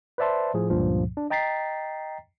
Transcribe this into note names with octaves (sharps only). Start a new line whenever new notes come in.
B4 C5 D5 E5 A5 C6
A2 F3 G#4
C#2 G2 A#2 F3
D4
D#5 G5 A#5 A6 B6 C7